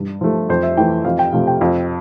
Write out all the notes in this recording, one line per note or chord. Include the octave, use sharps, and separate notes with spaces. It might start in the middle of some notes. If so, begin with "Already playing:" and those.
Already playing: G2
F3 A3
F2 C5
E5
E3 A3 G5
F2 F5
G5
C3 F3 A3 F5
G5
F2 F5